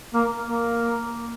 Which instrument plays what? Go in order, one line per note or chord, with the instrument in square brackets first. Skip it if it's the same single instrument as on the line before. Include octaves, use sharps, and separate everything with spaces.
[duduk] A#3
A#3